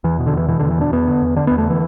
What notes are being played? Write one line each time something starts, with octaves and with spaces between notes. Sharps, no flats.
E2 E3
B2
D3
E2 E3
B2 E3
E2 D3
E3
B2 D4
E2 B3
D3
E2
D3 D4
E2 B3
A3
D3 E3